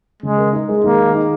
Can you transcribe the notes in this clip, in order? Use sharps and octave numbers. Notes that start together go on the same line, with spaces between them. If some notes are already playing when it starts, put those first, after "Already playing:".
C#3 G#3
A#4
D#4
G#3
D#3 A#3
G#4
D#4